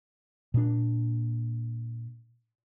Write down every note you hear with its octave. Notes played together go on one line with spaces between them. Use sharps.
A#2 D4